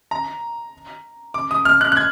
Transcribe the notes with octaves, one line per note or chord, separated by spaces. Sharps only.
A#5
D6
D#6
F6
F#6
F#6
G#6